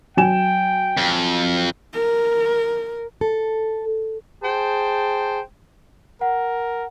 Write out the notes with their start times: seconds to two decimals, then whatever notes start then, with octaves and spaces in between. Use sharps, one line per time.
0.17 F#3 G5 G#5 E7
0.97 F2
1.93 A#4
3.21 A4
4.43 G#4 C5 G5 A5
6.21 A#4 F#5